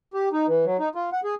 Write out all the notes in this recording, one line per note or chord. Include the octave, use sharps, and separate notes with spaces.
G4
D#4
E3
F#3
D#4
F4
F#5
G#4